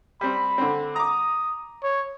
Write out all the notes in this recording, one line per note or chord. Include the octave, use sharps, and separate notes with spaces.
G3 C4 B5
D3 C4
A#5 D6 D#6
C#5